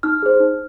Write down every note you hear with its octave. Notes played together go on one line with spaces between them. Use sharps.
D#4 F6
G#4 C5
D#4